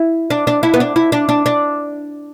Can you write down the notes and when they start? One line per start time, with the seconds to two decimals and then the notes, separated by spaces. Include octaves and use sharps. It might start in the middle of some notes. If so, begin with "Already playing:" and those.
Already playing: E4
0.30 D4
0.47 D4
0.63 E4
0.74 B3
0.80 D4
0.96 E4
1.12 D4
1.29 D4
1.46 D4